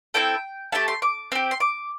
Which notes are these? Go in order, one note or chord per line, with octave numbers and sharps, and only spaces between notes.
C4 E4 A4 G5
A3 E4 G4 A5
C6
D6
C4 G4
C6
D6